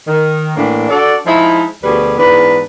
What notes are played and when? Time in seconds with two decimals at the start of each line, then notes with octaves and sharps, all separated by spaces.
0.07 D#3
0.56 A2 E3 A#3 D4
0.89 D4 F#4 A4 D5
1.25 F3 G#3 D#4 E4
1.83 D2 B2 G3 G4 G#4 B4
2.17 E2 G#2 D4 B4